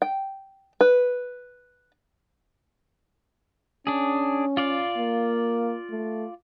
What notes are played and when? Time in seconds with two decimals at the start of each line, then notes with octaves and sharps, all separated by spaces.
0.02 G5
0.81 B4
3.87 C#4 D4 G#4
4.57 F4 D5 F5
4.97 A#3
5.90 A3